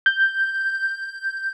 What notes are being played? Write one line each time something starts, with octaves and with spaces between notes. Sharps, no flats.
G6